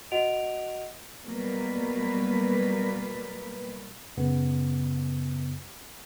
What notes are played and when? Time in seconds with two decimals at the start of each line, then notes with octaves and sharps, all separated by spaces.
0.12 F#4 D#5 F#5 D7 F7
1.25 B2 F#3 G3 A#3 B4
4.17 F#2 C#3 B3